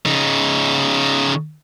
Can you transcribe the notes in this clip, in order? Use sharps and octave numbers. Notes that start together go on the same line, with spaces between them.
C#3 D#4